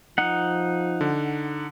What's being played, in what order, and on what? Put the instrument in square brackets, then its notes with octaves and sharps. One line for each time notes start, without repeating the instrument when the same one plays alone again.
[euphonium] F3 [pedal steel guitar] D#4 F#5
[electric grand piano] D3